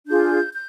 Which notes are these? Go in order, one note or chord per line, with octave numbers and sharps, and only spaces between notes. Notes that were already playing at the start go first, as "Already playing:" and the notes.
D4 F4 G#4 G6
G6